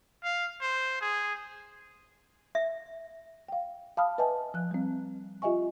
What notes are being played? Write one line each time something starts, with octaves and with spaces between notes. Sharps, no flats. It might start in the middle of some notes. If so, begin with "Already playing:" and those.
F5
C5
G#4
E5
F5 G5
F5 A5 B5 D6 D#6 F6
B4 D#5 E5 G#5 A5
F3 F#6
G3 C4
F4 G4 D#5 E5 G#5 C#6